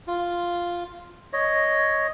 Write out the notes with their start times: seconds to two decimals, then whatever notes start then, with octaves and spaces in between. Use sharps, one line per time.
0.07 F4
1.33 C#5 D#5